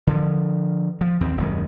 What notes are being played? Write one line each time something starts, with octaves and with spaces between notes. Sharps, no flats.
D3 F3
F3
D#2 C4
D#1 F#2 D#3 G#3